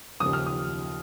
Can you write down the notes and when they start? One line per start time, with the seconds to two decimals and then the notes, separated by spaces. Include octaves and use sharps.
0.20 D#2 C#3 F3 D#6
0.33 F6
0.46 D#6